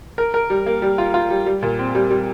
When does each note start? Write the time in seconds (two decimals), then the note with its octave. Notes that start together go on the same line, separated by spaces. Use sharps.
0.18 A#4
0.34 A#4
0.50 G3
0.66 A#3
0.82 G3
0.98 F4
1.14 F4
1.30 G3
1.46 G3
1.63 A#2
1.79 C4
1.95 G3
2.11 G3